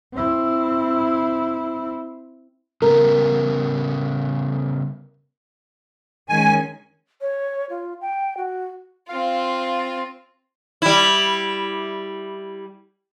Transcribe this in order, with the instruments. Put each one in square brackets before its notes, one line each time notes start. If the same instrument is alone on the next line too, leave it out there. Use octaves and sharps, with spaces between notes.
[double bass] C4 E4
[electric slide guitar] C#3 G3 B3 [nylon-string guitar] A#4
[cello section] D#3 G#3 C#4 [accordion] G#5
[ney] C#5
F4
G5
F#4
[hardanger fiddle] C4 F4 [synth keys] F5
[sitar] G3 E4